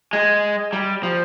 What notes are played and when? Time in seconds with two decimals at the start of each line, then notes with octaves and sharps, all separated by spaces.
0.13 G#3
0.73 G3
1.03 F3